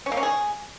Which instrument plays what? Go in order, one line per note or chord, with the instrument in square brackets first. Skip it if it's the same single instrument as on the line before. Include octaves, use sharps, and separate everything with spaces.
[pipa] C#4
A#3
C#4
G#4